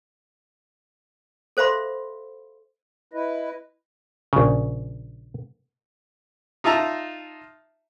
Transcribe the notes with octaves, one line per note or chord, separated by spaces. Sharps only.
A4 C5 E5 F5 B5 C6
E4 B4 D#5
A#1 C#3
D#4 F4 E5 A5 A#5